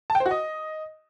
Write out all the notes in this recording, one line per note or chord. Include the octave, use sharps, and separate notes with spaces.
A5
G5
C5
F#4
D#5